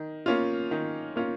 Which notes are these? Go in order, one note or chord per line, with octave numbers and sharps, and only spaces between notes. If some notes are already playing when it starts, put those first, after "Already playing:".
Already playing: D#3
A#3 C#4 F4
D#3
A#3 C#4 F4